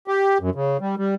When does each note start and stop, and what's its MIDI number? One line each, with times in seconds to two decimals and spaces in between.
0.07 0.38 67
0.41 0.50 42
0.55 0.77 49
0.81 0.95 55
0.98 1.15 55